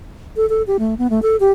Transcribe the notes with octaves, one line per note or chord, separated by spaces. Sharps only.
A4
A4
G4
A3
B3
A3
A4
G4